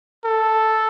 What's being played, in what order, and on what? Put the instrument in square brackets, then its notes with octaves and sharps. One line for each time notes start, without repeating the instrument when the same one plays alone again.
[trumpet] A4